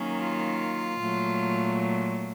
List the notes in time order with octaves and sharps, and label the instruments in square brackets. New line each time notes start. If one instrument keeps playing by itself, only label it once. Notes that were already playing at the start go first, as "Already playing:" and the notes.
Already playing: [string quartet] D#3 F#3 A#3 C#4
F4
A#2 F#3 A3